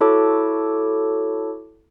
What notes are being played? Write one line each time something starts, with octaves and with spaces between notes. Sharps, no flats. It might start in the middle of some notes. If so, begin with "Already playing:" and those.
E4 F#4 A4 C#5 A5 D6